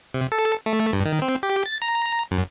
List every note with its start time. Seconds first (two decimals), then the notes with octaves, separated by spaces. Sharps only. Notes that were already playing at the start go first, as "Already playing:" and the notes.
0.14 C3
0.32 A4
0.66 A3
0.93 G2
1.06 D#3
1.22 C4
1.43 G4
1.66 A6
1.82 A#5
2.06 A#5
2.31 F#2